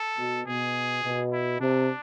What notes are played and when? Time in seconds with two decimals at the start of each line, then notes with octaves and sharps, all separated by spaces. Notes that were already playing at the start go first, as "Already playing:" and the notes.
Already playing: A4
0.18 B2
0.46 B2 G#4
1.04 B2
1.32 E4
1.60 C3 D4